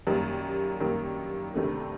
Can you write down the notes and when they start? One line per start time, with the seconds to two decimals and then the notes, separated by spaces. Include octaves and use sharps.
0.07 F#2 D#3 G3 A#3
0.80 F#2 D#3 G3 A#3
1.54 D2 C3 D#3 A3 D4